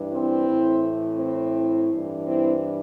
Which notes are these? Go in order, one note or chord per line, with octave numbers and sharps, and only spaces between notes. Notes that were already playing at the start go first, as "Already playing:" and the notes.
Already playing: G2 E3
C4 E4
A2 E3
C4 E4
G2 E3
C4 E4